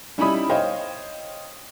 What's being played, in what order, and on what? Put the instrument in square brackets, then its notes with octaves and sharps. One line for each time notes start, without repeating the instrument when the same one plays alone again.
[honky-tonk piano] G3 C#4 D#4 E4 B5 D#6
C5 C#5 D#5 F5 G5